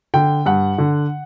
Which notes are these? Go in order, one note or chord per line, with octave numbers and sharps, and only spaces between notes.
D3 G5
G2 F#5
D3